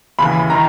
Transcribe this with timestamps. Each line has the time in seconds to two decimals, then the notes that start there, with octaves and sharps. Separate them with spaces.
0.18 D#2 C#3 E3 B5
0.50 D#3 A#5